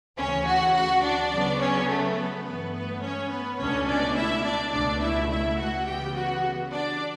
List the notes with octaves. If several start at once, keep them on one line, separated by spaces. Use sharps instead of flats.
D2 C#3 E3 C#4 C#5
F#4 F#5
F#4 F#5
D4 D5
C#3 F#3 B3
C#4 C#5
A3 A4
B3 B4
G2 E3 A3 B3 B4
B3 B4
C#4 C#5
B3 B4
C#2 B2 A3 C#4 D4 C#5
D4 D5
E4 E5
D4 D5
C#2 B2 A3 D4 D5
E4 E5
E4 E5
F#4 F#5
C#3 E3 G3 B3 G4 G5
F#4 F#5
D4 D5